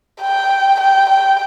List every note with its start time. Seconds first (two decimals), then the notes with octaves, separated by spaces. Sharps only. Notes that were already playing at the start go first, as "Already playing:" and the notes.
0.22 G5
0.80 G5
1.10 G5